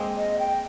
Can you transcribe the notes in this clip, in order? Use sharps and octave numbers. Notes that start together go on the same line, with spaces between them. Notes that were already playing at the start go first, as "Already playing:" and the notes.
Already playing: G#3 A#3 C4
D#5
G5